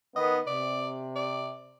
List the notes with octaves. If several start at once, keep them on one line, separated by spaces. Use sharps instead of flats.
D#3 B3 D#5
C3 D5
D5